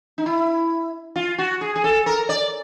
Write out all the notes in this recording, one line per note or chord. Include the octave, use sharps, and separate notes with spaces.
D#4
E4
F4
F#4
G#4
G#4
A4
A#4
D5